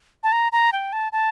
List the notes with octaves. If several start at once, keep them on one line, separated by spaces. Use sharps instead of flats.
A5
A#5
A#5
G5
A5
A5